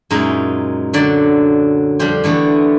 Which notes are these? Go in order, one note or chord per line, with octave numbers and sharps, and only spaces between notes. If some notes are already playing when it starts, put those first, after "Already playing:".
F#2 A#2 G#3 D#4 E5
D3 F#3 D5
F2 G3 D4 G4 C5
D3 E3 A3 B3